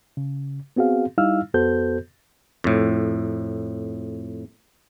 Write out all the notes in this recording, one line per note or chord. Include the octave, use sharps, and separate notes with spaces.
C#3
B3 C4 F#4 G#4 F5
G3 D#4 E4 F5 E6 F6
F2 B3 F#4 A4 C5 G6
F2 A2